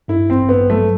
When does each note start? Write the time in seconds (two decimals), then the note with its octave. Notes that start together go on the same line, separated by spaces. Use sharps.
0.08 G2 E4
0.29 A1 C4
0.49 G2 B3
0.70 F#3 A3